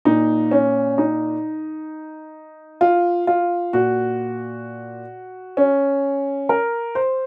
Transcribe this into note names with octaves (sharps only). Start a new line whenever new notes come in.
A#2 D#4
C#4
D#4
F4
F4
A#2 F#4
C#4
A#4
C5